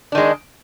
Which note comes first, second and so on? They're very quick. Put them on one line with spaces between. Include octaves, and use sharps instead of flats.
D4 D#3 G#3